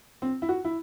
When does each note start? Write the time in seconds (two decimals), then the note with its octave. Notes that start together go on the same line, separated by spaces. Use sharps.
0.22 C4
0.42 E4
0.49 F#4
0.65 E4